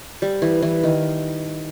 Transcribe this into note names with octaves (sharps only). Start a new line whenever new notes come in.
G3
E3
E3
D#3